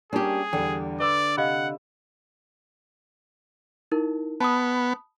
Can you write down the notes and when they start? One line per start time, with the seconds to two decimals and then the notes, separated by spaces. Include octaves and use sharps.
0.13 G3 A#3 C#4 D4 G4 G#4
0.53 E2 D3 G3 G5
1.00 B4 D5 D6 E6
1.37 C3 D#5 F5 F#5 B5
3.92 D#4 E4 A#4
4.40 B3 A5 B5 D#6